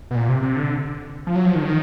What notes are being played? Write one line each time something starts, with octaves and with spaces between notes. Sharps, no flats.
B2
A#2
C3
C3
D3
F3
F#3
F3
D#3
D3
D#3